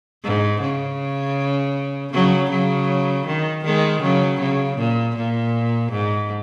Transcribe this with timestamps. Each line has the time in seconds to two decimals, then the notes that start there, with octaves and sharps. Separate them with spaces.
0.24 G#2
0.61 C#3
2.13 C#3 F#3
2.51 C#3 F#3
3.26 D#3
3.65 D#3 G#3
4.02 C#3 F#3
4.41 C#3
4.77 A#2
5.16 A#2
5.92 G#2